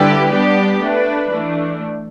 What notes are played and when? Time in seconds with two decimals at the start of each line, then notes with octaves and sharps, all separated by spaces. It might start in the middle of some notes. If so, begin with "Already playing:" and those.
Already playing: D3 G3 E4 G4 B4
0.31 G3 B3 D4 G4
0.81 A3 D4 B4
1.31 E3 A3 D4